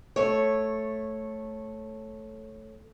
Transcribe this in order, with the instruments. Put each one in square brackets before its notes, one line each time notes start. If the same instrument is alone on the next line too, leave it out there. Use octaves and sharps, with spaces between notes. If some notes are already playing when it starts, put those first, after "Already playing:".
[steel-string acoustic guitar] A3 C#5